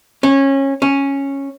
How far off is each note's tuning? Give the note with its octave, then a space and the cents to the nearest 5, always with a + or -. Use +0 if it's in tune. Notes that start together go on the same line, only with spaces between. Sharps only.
C#4 -20
C#4 -5